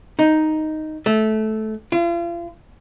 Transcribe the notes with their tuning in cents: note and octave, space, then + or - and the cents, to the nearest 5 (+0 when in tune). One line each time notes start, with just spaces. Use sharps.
D#4 +0
A3 -15
F4 -40